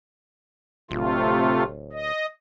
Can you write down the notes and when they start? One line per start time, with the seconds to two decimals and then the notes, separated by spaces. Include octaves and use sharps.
0.91 D1 C3 A3 F4
1.93 D#5